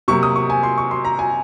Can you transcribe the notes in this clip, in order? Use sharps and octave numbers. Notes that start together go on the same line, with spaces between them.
C3 F#3 A#3 C#6
D#6
C#6
G#5
C6
C#6
C6
A#5
G#5